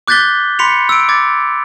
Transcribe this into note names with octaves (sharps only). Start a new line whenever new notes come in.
D6 F#6 G6 A6 B6 G7
B5 C6 B6 C#7 F7
E6 D7
D6 G#6 A6 D7